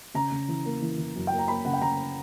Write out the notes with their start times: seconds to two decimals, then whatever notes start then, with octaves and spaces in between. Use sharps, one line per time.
0.14 C#3 A#5
0.32 C#3
0.48 E3
0.65 A#3
0.82 E3
0.98 E3
1.16 F#2
1.27 G5
1.32 A#3
1.38 A#5
1.48 A#3 B5
1.65 C#3 F#5
1.73 G5
1.82 C#3 A#5